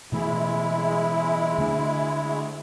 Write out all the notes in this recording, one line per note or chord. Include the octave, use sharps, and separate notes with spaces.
B2 E3 G#3 A3 E4
D3 A3 D4